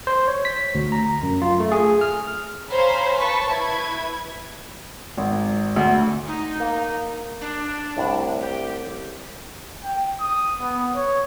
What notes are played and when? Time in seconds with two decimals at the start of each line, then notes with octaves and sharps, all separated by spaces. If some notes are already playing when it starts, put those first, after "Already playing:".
0.07 C5
0.28 C#5
0.45 B6
0.75 D2
0.92 A#5
1.23 F#2
1.42 F4
1.60 A3
1.72 G#4
2.01 F6
2.70 C5 C#5 F5 G#5 A#5 B5
3.18 B4 A5 C#6 B6
3.49 E4 B4 G#6
5.17 G#1
5.76 D2
6.27 D#4
6.60 A#3
7.41 D4
7.97 C2 A2
8.41 G4
9.84 G5
10.20 D#6
10.60 B3
10.95 C#5